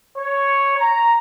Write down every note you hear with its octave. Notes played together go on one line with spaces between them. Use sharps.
C#5
A#5